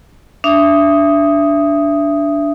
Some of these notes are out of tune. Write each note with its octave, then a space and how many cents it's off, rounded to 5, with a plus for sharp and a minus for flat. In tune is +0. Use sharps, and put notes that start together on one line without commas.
D4 -10 E5 +20 D#6 +0